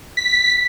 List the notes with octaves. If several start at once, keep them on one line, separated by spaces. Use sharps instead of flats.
B6